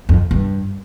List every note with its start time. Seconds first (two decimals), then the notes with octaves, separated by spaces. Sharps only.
0.09 F2
0.31 G2